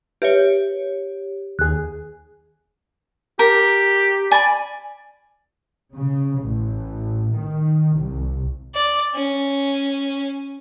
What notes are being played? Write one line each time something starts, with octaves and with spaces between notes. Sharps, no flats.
G4 B4 C#5 E5
D#2 G#4 F#6
G4 A#4
D5 G#5 B5
C#3
A1
D#3
C2
D5
C#4